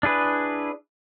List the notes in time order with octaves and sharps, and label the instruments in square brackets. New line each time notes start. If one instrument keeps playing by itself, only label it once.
[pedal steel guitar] D4 E4 G#4 B4